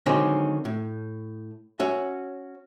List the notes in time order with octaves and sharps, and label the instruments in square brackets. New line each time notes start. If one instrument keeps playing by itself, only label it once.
[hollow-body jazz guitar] D3 D#3 F#3 G#3 C4 C#4
A2
C#4 F#4 E5